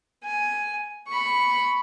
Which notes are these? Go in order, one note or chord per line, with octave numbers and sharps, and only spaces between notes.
G#5
B5 C#6